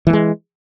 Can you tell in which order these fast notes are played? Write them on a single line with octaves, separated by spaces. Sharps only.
E3 A3 G#3